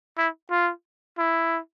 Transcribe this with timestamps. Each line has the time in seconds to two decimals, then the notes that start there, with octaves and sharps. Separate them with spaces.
0.18 E4
0.51 F4
1.18 E4